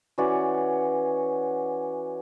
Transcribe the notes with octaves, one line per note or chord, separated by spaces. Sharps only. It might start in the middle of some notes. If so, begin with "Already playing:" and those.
E3 C#4 F#4 D5